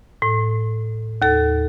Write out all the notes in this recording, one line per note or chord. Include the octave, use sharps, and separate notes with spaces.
A2
D#2 A4